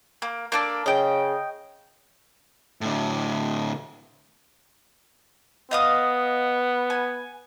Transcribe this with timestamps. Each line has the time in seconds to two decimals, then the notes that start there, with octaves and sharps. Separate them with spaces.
0.22 A#3
0.52 A#3 D4 A4
0.86 C#3 D#5 G5
2.81 A2 D3
5.71 B3 D#5 F5 D#6
6.90 G#5